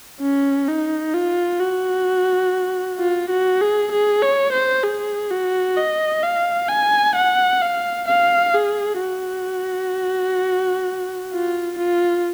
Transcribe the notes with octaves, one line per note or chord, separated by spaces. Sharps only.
C#4
D#4
F4
F#4
F4
F#4
G#4
G#4
C#5
C5
G#4
F#4
D#5
F5
G#5
F#5
F5
F5
G#4
F#4
F4
F4